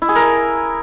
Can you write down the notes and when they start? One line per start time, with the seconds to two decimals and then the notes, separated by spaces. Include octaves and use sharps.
0.02 E4
0.09 G#4
0.16 A#4